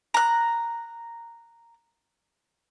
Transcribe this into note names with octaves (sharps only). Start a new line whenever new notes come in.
A#5 F#6